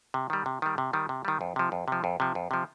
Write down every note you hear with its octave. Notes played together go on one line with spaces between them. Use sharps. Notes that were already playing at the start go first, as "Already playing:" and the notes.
C3
D#3 G3
C3
D#3 G3
C3
D#3 G3
C3
D#3 G3
F2
C3 F3
F2
C3 F3
F2
C3 F3
F2
C3 F3